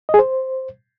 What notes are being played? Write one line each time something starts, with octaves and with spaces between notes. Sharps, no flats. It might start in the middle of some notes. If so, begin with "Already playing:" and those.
D#5
G#4
C5